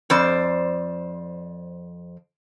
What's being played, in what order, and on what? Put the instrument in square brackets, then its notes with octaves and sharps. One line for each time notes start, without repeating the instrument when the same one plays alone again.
[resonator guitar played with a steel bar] F2 C5 D5